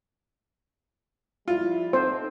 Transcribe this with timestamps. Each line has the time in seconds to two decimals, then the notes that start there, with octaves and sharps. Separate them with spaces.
1.48 F3 G3 E4 F4
1.93 C4 D#4 A4 C5